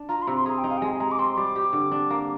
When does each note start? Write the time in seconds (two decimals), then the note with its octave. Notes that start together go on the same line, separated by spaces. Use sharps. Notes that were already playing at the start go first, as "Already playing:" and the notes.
Already playing: D4
0.09 F4 A#5
0.22 C6
0.27 C3 A#5
0.37 C6
0.46 G#4 A#5
0.58 G5
0.64 D#4
0.70 F5
0.77 G5
0.82 G#3 G#5
1.00 G#3 A#5
1.12 D6
1.19 C4 C6
1.37 G3 D6
1.56 G4
1.73 D3
1.91 D4
2.10 A#3